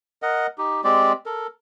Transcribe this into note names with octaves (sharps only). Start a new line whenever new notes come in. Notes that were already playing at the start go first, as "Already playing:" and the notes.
A#4 D#5 F#5
D#4 G4
G#3 C4 G4 D5
A4 A#4